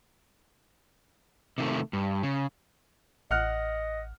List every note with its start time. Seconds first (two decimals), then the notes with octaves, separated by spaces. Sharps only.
1.58 C3 D#3 A3
1.93 G2
2.23 C#3
3.31 A1 D#5 F#5 F6 F#6